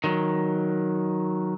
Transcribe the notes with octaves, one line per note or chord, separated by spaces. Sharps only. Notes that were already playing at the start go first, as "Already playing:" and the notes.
D#3 F#3